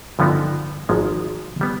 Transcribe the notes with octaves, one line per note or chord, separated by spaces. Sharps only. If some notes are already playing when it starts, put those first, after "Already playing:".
G2 D3 F3 B3 D#4
G#1 G#2 F3 G#3
G3 B3